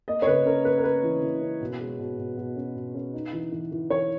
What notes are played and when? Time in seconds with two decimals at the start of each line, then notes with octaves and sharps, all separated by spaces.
0.08 A#3 D#5
0.22 C#5
0.27 C#3 B4
0.46 C#4 A#4
0.65 A#3 B4
0.78 A#4
0.84 A#3 B4
1.03 E3
1.23 E3
1.42 C#4
1.61 B2
1.80 G#3
1.99 B2
2.18 B2
2.37 B2
2.56 C#4
2.76 B2
2.95 C#4
3.14 D#4
3.33 E3
3.52 E3
3.72 E3
3.90 E3 C#5